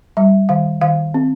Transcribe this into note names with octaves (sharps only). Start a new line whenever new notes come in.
G3 E5
D#3 F5
D#3 F5
C4